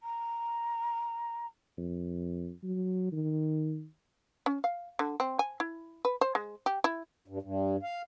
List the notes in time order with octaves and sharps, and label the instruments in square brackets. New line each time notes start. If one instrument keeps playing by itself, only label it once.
[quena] A#5
[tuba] F2
F#3
D#3
[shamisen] C#4
F5
D3
C4
G#5
E4
B4
C5
G#3
G4
E4
[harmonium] G2
G2
F5